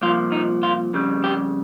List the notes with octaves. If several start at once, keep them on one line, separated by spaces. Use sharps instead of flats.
C2 A#2 F3 F4
D#4
F4
F2 C#3 G3
G4